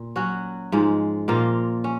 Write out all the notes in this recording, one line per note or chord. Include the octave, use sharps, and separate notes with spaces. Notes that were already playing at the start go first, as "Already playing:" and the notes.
Already playing: A#2
F#3 C#4 F#4
G#2 F3 G#3
A#2 F3 A#3 F4
C#4